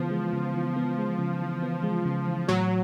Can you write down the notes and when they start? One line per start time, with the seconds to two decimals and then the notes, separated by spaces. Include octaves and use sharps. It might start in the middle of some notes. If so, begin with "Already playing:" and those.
Already playing: C#3 E3 F3 G#3 B3
0.11 G#3
0.33 C#3
0.54 E3
0.76 B3
0.98 G#3
1.19 C#3
1.40 E3
1.62 B3
1.83 G#3
2.05 C#3
2.28 E3
2.48 A2 F#3